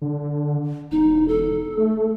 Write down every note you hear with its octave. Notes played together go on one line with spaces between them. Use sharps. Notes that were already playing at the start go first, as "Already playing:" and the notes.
D3
E1 D#4
A4
A3